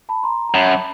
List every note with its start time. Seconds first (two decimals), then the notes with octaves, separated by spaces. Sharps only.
0.09 A5 B5
0.23 A#5 C6
0.49 A#5
0.54 F#2 A5 B5